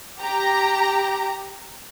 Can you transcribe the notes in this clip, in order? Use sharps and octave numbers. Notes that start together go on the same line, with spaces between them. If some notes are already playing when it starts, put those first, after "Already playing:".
G4 A#5